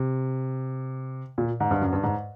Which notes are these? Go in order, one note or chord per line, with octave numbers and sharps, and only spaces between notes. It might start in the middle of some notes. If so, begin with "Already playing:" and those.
Already playing: C3
A#2
G#2
G2
F#2
G2
G#2